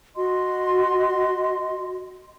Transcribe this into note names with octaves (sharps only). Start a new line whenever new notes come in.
F#4 D#5 C6